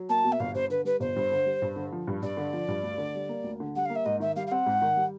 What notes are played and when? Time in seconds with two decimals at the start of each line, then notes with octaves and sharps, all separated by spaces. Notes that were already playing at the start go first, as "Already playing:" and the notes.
Already playing: F#3
0.09 A#3 A5
0.24 B2
0.32 E5
0.40 G1 F5
0.54 G2 C5
0.70 D3 B4
0.85 G3 B4
1.00 G1 C5
1.16 G2
1.32 D3
1.46 G3
1.62 G2
1.76 D3
1.92 F3
2.07 G2
2.22 G2 D5
2.37 D3
2.53 F3
2.68 G2
2.83 D2
2.98 D3
3.15 G3
3.29 A#3
3.44 D2
3.60 D3
3.75 G3 F#5
3.85 A#3 F5
3.95 E5
4.05 G#2 D#5
4.20 D#3 E5
4.36 G3 F5
4.47 F5
4.51 C4 F#5
4.66 G#2
4.82 D#3
4.97 G3